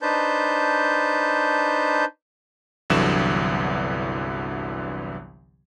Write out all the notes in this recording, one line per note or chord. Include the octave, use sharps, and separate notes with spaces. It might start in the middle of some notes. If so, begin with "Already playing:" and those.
D4 D#4 B4 C5 A5 G6
G1 C2 D3 E3 F#3 E7